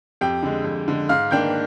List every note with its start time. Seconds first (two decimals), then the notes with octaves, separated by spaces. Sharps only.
0.21 F2 G4 G5
0.43 D3 G#3
0.64 F2
0.88 D3 G#3
1.09 G#2 F5 F6
1.31 D#3 A#3 D4 G5 G6